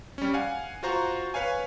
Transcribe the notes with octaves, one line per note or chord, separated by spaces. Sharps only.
G3 C#4
F5 F#5 G#5
F4 F#4 C5 A#5 C#6
B4 C#5 F5 G#5